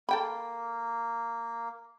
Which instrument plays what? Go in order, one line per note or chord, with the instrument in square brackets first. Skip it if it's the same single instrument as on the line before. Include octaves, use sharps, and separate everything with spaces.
[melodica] A#3 [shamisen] A4 G5 B5